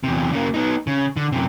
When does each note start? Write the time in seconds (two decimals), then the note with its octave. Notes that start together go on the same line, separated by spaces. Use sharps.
0.04 E2 C3
0.32 C#3 A#3
0.54 B3 D#4
0.87 C#3
1.17 D3
1.32 F#2 C3